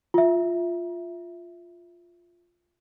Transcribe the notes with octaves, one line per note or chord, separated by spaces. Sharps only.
F4 E5